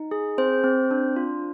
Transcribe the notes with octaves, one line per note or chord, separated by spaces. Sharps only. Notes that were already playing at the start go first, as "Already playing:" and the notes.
Already playing: D#4
G#4
C4 C5
C4
D4
F4